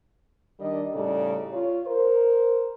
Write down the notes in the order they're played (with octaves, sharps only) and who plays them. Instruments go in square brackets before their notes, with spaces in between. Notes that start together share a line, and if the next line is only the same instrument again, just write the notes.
[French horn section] D#3 G3 D4 A#4 D#5
A2 C#3 G3 D#4 A4 D5
F4 C#5
A#4 C5